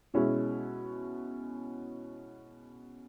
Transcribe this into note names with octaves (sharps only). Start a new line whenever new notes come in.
B2 G#3 C#4 E4